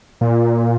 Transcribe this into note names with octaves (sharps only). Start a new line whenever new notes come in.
A#2